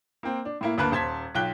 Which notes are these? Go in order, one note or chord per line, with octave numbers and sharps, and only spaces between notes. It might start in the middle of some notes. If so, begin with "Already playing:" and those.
A#3 C4
D4
A2 A#3 E4
D2 A#3 B4 A5 F#6
D#1 C5 A5 C6 G#6 B6
B1 F4 G5 F#6 G7